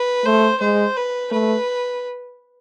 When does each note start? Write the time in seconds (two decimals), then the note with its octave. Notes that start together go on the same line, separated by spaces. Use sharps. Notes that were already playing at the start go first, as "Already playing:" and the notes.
Already playing: B4
0.25 A3 C5
0.60 G#3 C5
0.96 B4
1.32 A3 B4